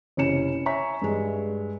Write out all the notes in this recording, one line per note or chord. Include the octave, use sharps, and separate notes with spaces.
F#1 C3 C#4 E4 C#7 E7
C#5 E5 G#5 A#5 C#6 B6
G2 G#3